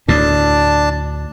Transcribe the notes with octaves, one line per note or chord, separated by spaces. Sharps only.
D2 A2 D4 A5